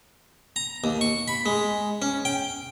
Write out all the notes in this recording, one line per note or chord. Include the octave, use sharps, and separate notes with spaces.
A#5
D#2
C#6
B5
G#3
C#4
G5